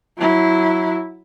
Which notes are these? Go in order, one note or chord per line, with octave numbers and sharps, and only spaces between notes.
F#3 E4